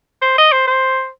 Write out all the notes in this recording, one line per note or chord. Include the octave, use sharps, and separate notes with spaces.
C5
D#5
C5
C5